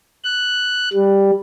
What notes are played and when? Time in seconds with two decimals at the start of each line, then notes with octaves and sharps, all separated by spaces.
0.24 F#6
0.93 G3